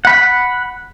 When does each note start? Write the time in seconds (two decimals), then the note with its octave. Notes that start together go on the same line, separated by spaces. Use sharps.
0.05 F#5 B5